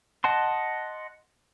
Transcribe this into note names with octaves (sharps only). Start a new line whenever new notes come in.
D#5 F#5 A5 C6